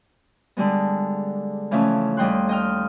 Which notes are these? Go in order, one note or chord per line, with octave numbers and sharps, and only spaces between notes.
D3 G3 G#3 B3
C#3 E3 F3 A3 C#4
D#2 G3 D#5 G5 C6 F#6
D#5 G5 F6